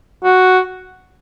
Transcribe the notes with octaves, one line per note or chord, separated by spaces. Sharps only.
F#4